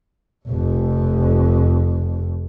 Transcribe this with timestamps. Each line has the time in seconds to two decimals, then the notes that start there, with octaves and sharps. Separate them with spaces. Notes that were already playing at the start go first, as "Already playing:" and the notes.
0.48 F1 F2